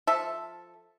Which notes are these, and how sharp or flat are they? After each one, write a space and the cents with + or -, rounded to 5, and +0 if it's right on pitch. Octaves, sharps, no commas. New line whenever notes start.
F3 +0 A4 +0 E5 +0